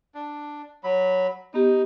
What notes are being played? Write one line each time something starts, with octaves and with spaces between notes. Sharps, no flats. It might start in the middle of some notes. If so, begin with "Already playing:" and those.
D4
F#3 B5
B3 D#4 G4